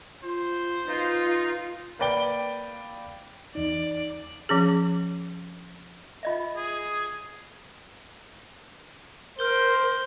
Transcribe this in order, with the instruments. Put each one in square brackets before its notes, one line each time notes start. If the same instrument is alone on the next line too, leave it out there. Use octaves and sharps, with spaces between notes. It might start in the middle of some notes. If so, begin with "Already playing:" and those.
[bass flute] F4 [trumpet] C5
[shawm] D#4 [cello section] F4 [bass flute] B4
[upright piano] A#3 B4 D5 G5 G7
[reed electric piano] E2 D#4 [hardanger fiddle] D5
[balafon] F3 C#4 G#4
[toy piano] F4 D#5 E5
[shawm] G#4
[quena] A#4 [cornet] C5 [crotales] F6 G6 G7